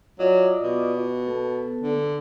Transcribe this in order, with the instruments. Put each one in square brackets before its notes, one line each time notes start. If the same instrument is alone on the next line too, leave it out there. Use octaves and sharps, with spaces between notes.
[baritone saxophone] F#3 [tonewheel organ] F4 D5 D#5
[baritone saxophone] B2
[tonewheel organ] B3 A4
[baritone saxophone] D3